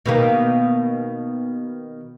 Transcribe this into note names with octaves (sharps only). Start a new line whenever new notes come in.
B2 D#3 A#3